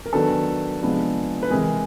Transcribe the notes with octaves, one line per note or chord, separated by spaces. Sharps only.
A#4
D#3 F#3 B3 D4 A4 B4
C3 F3 G#3 B3 D4
B4
C3 E3 G#3 C4 G#4 A#4